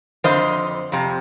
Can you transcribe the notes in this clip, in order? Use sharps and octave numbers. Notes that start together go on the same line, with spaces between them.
F2 D3 F3 C5 D#5
F2 C3